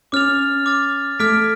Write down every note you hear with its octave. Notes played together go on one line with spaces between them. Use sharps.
C#4 D6 F6 A6 F7
D6 F6 A6 F7
A3 D6 F6 G#6 B6 D7